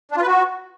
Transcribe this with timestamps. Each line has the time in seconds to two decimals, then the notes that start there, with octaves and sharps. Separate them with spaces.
0.11 D4
0.17 F4
0.22 B4
0.27 F#4